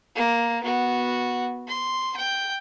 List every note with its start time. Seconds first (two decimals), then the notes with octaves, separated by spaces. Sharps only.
0.15 A#3
0.63 B3 F#4
1.68 C6
2.17 G5